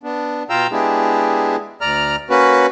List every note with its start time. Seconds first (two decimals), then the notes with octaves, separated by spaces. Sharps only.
0.03 B3 D4
0.50 B2 F4 F5 G5 A#5 E6
0.72 G#3 B3 D4 E4 G4 G#4
1.81 D2 D5 A#5 F6
2.30 A#3 C#4 F#4 B4